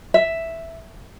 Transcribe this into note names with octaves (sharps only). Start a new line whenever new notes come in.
E5